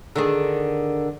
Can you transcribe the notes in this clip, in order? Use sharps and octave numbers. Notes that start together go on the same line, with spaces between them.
D3 D#3 G#4